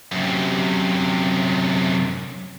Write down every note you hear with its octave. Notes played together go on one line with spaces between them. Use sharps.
F#2 C3